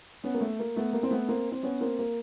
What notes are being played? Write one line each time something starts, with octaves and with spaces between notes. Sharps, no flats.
B3 C#4
A#3
A3
A#3
A3 B3
A#3
C4
A3 B3
A#3 C4
C4
B3 C#4
A#3 C4
A#3